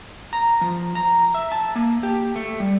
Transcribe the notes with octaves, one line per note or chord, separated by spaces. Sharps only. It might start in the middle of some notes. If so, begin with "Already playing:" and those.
A#5
F3
A#5
E5
A5
A#3
G4
A3
G3